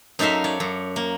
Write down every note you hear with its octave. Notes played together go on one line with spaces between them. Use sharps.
F#2 D#4 A4 E5 F5 C6
C#5 D5
F#2
A#3